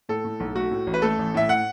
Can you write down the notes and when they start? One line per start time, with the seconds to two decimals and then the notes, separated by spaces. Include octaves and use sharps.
0.09 A2 A4
0.24 A2
0.40 B1
0.55 A3 F#4
0.71 A2
0.87 A1
0.94 B4
1.02 A3 A4
1.18 A1
1.34 A2 E5
1.49 F#5